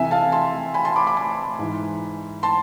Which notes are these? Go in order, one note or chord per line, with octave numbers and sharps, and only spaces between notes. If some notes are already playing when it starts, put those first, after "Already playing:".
Already playing: F2 C3 E3 E5 G#5
F5 A5
A5 C6
G#5 B5
A5 C6
B5 D6
B5 D6
G#5 B5
G#2 E3
A5 C6